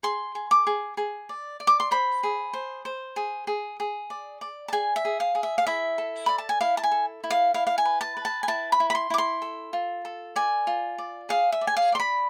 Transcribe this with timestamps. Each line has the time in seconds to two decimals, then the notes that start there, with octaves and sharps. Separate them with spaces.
0.03 G#4 C6
0.35 G#4
0.51 D6
0.67 G#4
0.97 G#4
1.29 D5
1.60 D5
1.67 D6
1.80 C6
1.91 C5 B5
2.23 G#4
2.53 C5
2.85 C5
3.16 G#4
3.47 G#4
3.80 G#4
4.10 D5
4.41 D5
4.68 A5
4.73 G#4 G#5
4.96 E5
5.05 G#4
5.20 F5
5.35 G#4
5.43 E5
5.58 F5
5.67 E4 E5
5.98 A4
6.26 D5 B5
6.38 A5
6.49 G#5
6.61 E4 F5
6.77 A5
6.84 G#5
6.92 A4
7.24 E4
7.30 F5
7.54 E4 F5
7.67 F5
7.78 G#5
7.85 B4
8.01 A5
8.17 B4
8.25 A5
8.43 G#5
8.48 E4 A5
8.72 B5
8.80 E4
8.90 B5
8.95 C6
9.10 E4 D6
9.18 C6
9.42 A4
9.73 F4
10.05 A4
10.36 D5 G#5
10.67 F4
10.98 D5
11.29 G#4 F5
11.52 E5
11.61 D5
11.67 G#5
11.77 F5
11.92 D5 C6
12.00 B5